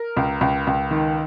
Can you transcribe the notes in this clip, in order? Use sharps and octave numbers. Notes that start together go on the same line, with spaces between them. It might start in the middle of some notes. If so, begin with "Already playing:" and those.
Already playing: A#4
C#2
C#2
C#2
D#3